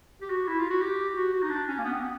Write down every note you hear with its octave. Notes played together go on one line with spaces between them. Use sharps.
G4
F#4
E4
F4
F#4
G4
F#4
F#4
D#4
D4
C#4
A#3
B3
C4
B3